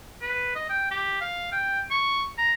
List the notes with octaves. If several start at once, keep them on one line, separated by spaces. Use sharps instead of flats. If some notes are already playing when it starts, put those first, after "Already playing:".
B4
D#5
G5
G4
F5
G5
C#6
A#5